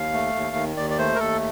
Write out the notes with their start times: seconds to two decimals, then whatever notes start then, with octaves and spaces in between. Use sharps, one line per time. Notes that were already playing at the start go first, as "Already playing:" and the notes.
Already playing: D#2 F5
0.13 A3
0.35 D#2
0.56 D#3
0.77 D#2 D5
0.90 D5
0.98 A3 C5
1.15 A#4
1.19 D#2 A4